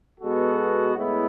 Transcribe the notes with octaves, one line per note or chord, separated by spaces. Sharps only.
B2 G#3 B3 F#4 A4
A2 G#3 B3 E4